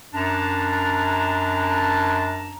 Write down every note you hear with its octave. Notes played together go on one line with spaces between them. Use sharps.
F#2 D4 A5 A#5